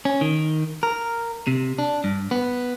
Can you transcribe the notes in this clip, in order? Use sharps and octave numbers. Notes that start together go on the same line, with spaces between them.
C#4
D#3
A#4
C3
D4
G2
B3